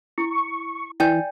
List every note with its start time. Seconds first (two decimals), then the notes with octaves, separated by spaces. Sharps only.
0.18 E4 C#6
1.00 E3 D5 G5 G#5 G6